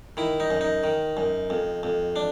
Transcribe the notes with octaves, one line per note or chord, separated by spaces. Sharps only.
D#3 E4
D#4
F#2
D#4
D#3
F#2
F2
F2
D4